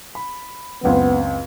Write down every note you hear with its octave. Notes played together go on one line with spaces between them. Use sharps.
B5
F#1 C#2 B3 C4